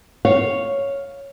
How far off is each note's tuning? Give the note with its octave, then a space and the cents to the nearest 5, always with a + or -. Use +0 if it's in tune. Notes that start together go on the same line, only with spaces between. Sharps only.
C#5 +0 F5 +0